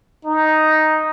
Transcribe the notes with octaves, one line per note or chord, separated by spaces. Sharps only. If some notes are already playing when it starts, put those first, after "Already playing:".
D#4